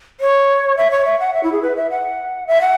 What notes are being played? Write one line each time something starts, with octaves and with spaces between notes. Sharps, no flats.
C#5
E5
C#5
E5
F#5
E5
E4
G#4
B4
E5
F#5
E5
F#5